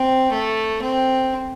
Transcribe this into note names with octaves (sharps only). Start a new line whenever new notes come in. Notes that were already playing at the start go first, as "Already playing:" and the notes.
Already playing: C4
A3
C4